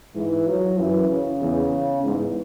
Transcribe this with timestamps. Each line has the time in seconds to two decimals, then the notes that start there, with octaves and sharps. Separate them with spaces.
0.15 G#2 E3
0.47 F#3
0.78 F#2 E3
1.09 C#3
1.41 E2
2.03 E2 G#2